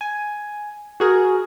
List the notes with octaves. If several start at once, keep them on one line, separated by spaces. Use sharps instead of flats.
G#5
F#4 G#4 A#4